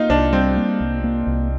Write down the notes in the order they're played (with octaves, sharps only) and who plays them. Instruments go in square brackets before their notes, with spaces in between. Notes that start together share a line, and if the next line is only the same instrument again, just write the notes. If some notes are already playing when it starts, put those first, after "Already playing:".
Already playing: [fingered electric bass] A#3 [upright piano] D#4 F4
[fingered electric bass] C2 [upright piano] D4
[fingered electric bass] G3 [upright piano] C4
[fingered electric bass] A#3
C2
A#3
C2